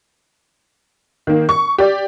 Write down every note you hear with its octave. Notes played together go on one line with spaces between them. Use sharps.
D#3 A#3
C#6
G4 D5